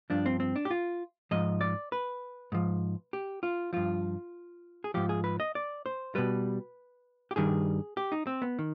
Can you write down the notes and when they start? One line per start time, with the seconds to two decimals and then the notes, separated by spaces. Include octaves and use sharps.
0.10 G2 F3 D4
0.26 C4
0.40 C4
0.56 D4
0.65 G4
0.70 F4
1.31 G#2 F3 D#5
1.61 D5
1.92 B4
2.52 G#2 F3
3.13 G4
3.43 F4
3.73 G2 F3 F4
4.84 G#4
4.94 G#2 F3 G4
5.09 G#4
5.24 B4
5.40 D#5
5.55 D5
5.86 C5
6.15 B2 G3 B4
7.31 G4
7.36 G2 D#3 G3 G#4
7.97 G4
8.12 D#4
8.27 C4
8.42 B3
8.59 D#3